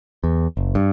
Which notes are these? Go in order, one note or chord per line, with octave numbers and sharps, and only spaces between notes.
E2
F#1
G2